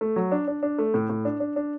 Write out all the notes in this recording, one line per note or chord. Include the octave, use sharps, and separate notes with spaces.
A3
F#3
D4
D4
D4
A3
A2
A2
D4
D4
D4